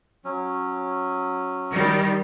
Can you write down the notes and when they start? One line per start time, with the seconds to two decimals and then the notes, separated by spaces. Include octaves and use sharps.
0.25 F#3 C#4
1.71 D#3 G3